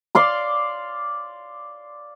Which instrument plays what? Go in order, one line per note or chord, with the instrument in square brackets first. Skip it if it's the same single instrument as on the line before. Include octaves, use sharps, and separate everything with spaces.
[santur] D5 F5 C6 D6